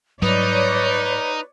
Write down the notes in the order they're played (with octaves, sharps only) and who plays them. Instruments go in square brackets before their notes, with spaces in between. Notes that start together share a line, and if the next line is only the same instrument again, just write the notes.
[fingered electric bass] G#2 F#3 G3 [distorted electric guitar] D#4 [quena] B4 [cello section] C#5 D5